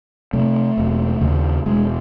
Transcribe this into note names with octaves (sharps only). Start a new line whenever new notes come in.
C3 A3
E1
D#2 C#3
E1 G#3